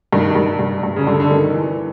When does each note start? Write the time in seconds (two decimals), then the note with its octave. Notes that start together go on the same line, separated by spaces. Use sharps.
0.13 G2 D#3
0.35 G2
0.59 G2
0.83 G2
0.96 C#3
1.06 G2 D3
1.20 D3
1.31 G2 D#3
1.54 E3